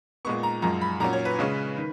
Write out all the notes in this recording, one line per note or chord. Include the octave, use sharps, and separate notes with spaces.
A#2 G#3 B3 C#6
A#5
F#2 F3 G#3 A#5
B5
A#2 F#3 C#4 A#5
C#5
B4
C#3 G#3 C#4
D#3